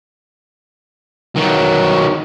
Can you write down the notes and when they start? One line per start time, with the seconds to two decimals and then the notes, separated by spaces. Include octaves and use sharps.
1.36 D#3 F#3